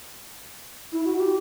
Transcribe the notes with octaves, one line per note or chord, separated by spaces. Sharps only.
E4
F#4
G4